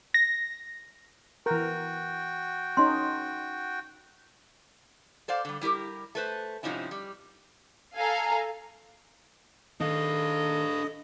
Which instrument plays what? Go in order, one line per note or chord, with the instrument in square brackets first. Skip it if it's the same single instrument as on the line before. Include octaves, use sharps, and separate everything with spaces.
[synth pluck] A#6
[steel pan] E3 A#4 [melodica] F#4 G5
[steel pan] C#4 D#4 [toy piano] C6
[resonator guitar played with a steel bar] A4 C5 D5 F5
D3 G3
G3 E4 G4 A#4
A3 B4 C5
G#2 C3 F3 C#4 D#4 E4
G3
[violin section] A4 F5 G#5 A#5
[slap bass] D#3 [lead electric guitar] D4 F5 [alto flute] A4 [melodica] D#5